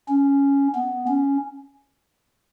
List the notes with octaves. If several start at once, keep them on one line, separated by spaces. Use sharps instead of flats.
C#4
B3
C#4